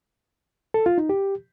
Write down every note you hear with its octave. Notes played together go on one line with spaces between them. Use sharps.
A4
F4
D#4
G4